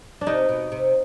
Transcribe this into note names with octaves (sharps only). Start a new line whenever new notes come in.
D4
C3 D#4
B2
C3